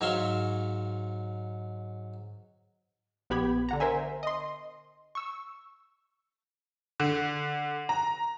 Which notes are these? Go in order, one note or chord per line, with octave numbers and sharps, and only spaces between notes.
G#2 F#3 C#5 E5 F5 C6
A#1 B3 G4 B5 G#6
D3 F#5 A#5
A#4 C5 E5 G#5
D#5 C6
C#6 E6
D3
A#5